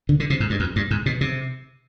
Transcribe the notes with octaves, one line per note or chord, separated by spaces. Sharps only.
D3
D3
C3
G#2
G2
F2
G2
G#2
B2
C3